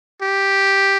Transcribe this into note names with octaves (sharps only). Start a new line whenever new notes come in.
G4